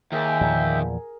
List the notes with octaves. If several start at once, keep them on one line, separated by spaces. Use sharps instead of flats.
D#2 G#4 A#4 E5 G5
E2 A#2 F3